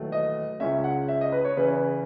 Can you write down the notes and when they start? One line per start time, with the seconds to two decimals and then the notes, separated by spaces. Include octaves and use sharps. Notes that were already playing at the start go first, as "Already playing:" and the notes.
Already playing: E1 D#2 D#3 F#3 A3
0.12 D#5
0.60 C#2 C#3 G#3 C#4 E5
0.84 F#5
1.08 E5
1.21 D#5
1.32 B4
1.45 C#5
1.56 E2 C#3 E3 B4